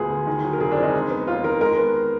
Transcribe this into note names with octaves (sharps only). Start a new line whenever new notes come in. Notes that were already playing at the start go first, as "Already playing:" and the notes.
Already playing: D2 A#2 G#3 B3 G#4
D3
D#3
F#3
A#4
F1 G#4
D4
F2
D#4
G#3
B3
D#2 F4
D#3 A#4
G#3 A#4
B3